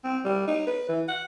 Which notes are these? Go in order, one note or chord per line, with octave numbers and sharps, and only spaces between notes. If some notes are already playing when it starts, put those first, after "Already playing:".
C4
G3
D#4
B4
E3
F#5